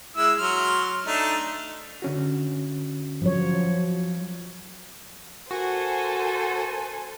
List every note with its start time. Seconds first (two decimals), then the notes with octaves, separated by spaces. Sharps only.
0.17 G#3 E4 E6
0.38 F#3 C6 F6
1.07 A3 D4 D#4
2.02 D3 C#4 F#4
3.22 F3 F#3 C#5
5.51 F#4 A4 A#4 C5 G#5